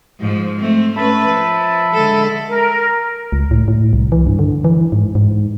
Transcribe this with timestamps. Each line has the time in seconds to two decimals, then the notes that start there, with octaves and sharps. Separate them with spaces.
0.20 G#2 F3
0.59 A3 C4
0.96 C#4 B4 E5 A5 B5
1.28 F3
1.94 D3 G#3 A4
2.48 A#4
3.32 C#2
3.51 A2
3.68 A2
3.93 C2
4.12 E3
4.27 G2
4.39 D3
4.64 E3
4.92 G#2
5.15 G#2